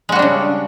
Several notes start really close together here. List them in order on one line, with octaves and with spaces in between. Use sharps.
G#3 F#4 G3 D4 C#3